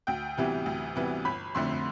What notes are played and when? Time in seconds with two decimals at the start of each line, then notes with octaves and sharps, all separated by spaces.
0.07 D2 G5
0.38 C3 E3 G3 B3
0.66 D2
0.96 C3 E3 G3 B3
1.25 G1 B5
1.55 F2 D3 A3 C6